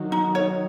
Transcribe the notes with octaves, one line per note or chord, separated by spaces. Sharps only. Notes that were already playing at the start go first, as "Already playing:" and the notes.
Already playing: D#3 F#3
D#4
C#5